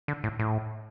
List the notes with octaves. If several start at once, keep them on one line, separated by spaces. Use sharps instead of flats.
D3
A2
A2